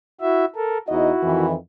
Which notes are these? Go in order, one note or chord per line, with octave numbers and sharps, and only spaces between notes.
E4 F#4 E5
A4 A#4
E2 D#4 E4 F#4 D#5
F2 D#3 E3